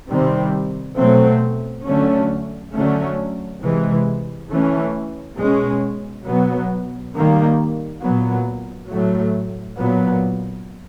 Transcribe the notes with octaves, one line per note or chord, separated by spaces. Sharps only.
C3 D#3 G3 C4
B2 F#3 A3 C4
D3 F#3 A3 C#4
D3 F#3 A3 C#4
C3 E3 G#3
E3 A3 C#4
B2 G#3 C#4
B2 F#3 B3
D#3 G3 A#3
A#2 F#3 B3
A2 F#3 A3
A#2 F#3 B3